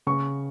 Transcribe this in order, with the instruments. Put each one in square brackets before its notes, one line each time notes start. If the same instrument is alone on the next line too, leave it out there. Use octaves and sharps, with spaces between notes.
[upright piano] C#3 C#6